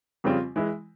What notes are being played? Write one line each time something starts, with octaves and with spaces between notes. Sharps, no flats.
F2 C#3 G3 C4 F4
E3 G#3 E4